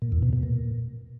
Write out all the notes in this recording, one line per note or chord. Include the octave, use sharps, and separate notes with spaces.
A#2
E2
B2
B2
A#2